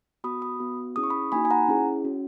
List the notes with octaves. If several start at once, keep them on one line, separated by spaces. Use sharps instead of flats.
B3 F#4 B5 D#6
B5 D#6
B3 F#4
C#4 E4 G#4 D#6
C#6
B5 D#6
A#3 D#4 F#4 G#5 B5
G#5
F#5 A#5
C#4 E4 G#4
C#4 F#4